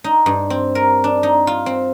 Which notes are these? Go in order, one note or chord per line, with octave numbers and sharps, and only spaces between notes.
D#4
G2
C4
A#4
D4
D#4
F4
C4